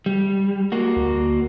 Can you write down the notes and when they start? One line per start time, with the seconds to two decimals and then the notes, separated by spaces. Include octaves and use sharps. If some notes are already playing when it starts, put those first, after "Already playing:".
0.06 G3
0.72 A#3 F#4
0.96 D2